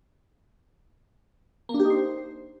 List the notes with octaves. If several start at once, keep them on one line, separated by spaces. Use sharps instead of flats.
A#3
D4
G4
D#4
C5